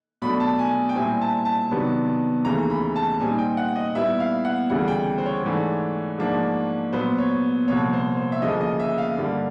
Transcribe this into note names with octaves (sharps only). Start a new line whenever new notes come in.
B2 F#3 A3 D4 B5
A5
G#5
G5
A#2 G3 C4 E4 G#5
A5
A5
C3 D#3 F#3 B3 D4
D#2 C#3 E3 A3 A#5
B5
A5
A#2 G3 C4 D#4 G#5
G5
F#5
D#5
A#2 G3 B3 E4 E5
F5
F#5
D2 C#3 E3 G3 F#5
G5
C5
C#5
G#2 E3 A3 D4
G#2 F3 A#3 D4
A#2 F#3 B3 C5
C#5
C2 A#2 F3 C#5
C5
C5
E5
D2 C#3 F3 A#3 D#5
D#5
E5
F5
G2 D3 G3 A#3 D4